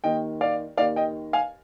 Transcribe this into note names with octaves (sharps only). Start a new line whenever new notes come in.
D#2 D#3 D#5 G5
D5 F5
D#2 D#3 D5 F5
D#5 G5
F5 G#5